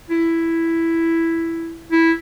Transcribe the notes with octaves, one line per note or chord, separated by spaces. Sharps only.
E4
E4